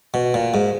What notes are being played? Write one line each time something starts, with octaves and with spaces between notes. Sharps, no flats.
B2
A#2
G#2